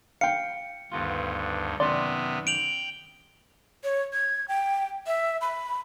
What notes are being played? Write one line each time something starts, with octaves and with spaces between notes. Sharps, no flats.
F5 G5 C#7
D2 G2 D#3 B3 F4
F#2 C3 D#3 B3 D5 C6
G5 D7 F7 F#7
C#5
G#6
G5
E5
B5